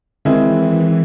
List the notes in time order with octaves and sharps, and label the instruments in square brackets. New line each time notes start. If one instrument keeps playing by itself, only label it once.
[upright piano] D#3 G#3 C4 E4 [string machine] E3